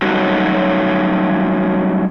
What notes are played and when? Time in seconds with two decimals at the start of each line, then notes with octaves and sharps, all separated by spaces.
0.02 F#3 G3 A3 C#4 D#4 F#4